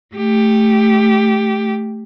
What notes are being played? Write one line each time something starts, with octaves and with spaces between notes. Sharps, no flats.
A3 G4